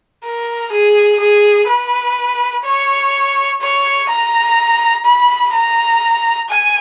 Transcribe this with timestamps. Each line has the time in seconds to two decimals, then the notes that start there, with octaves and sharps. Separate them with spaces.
0.24 A#4
0.72 G#4
1.19 G#4
1.67 B4
2.64 C#5
3.61 C#5
4.09 A#5
5.05 B5
5.53 A#5
6.49 G#5